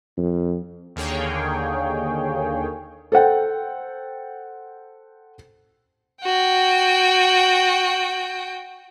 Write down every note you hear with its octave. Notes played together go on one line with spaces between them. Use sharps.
F2
D#2 D3 A#3 G#4 C#5 G5
A4 C5 F#5 G5
F#4 G5